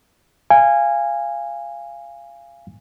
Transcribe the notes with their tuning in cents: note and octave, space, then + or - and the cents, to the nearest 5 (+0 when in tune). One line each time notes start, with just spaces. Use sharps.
F5 -20 G#5 -15